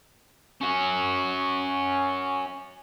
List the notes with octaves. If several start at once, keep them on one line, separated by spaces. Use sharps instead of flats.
C#4 F#4